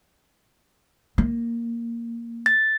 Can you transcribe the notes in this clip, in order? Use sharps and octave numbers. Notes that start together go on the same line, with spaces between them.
A#3
A6